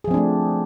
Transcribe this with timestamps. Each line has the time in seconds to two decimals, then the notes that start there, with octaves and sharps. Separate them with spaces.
0.04 G#4
0.08 F3
0.11 C4
0.14 D4
0.17 A3